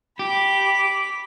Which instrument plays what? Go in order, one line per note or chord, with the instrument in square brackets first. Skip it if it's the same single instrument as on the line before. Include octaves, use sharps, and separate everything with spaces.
[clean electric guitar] G4 [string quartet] B5 D6